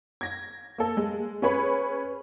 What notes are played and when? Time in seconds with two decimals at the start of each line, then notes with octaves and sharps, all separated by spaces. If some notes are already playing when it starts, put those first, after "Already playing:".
0.21 G#6 A#6
0.78 A#3 A4
0.97 G#3
1.42 C#4 G#4 B4 C#5 B5